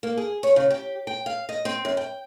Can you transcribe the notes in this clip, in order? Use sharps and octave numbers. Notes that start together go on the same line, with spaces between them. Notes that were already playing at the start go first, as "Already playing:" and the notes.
A#3
G#4
C#5
C#3
G4
G5
F5
D#5
C4
F#2
G5